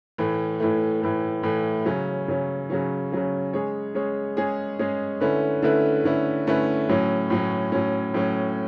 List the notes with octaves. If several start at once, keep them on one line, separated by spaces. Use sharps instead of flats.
A2 E3 A3
A2 E3 A3
A2 E3 A3
A2 E3 A3
C#3 F#3 C#4
C#3 F#3 C#4
C#3 F#3 C#4
C#3 F#3 C#4
G#3 C#4 G#4 C#5
G#3 C#4 G#4 C#5
G#3 C#4 G#4 C#5
G#3 C#4 G#4 C#5
D3 A3 C#4 E4 B4
D3 A3 C#4 E4 B4
D3 A3 C#4 E4 B4
D3 A3 C#4 E4 B4
A2 F#3 C#4
A2 F#3 C#4
A2 F#3 C#4
A2 F#3 C#4